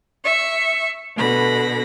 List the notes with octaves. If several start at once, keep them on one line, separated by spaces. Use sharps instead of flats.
E5 C#6
B2 D3 B5 A#6